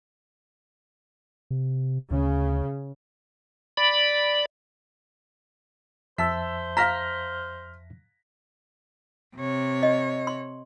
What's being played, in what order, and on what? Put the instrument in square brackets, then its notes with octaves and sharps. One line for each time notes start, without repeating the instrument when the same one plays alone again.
[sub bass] C3
[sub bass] D2 [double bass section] C#3
[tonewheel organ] D5 B5
[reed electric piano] F2 E5 A5 [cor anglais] C5 [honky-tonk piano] E6 B6
[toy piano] F5 A#5 [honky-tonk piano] F6 A#6 B6
[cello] C3 C#5
[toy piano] D#5
C6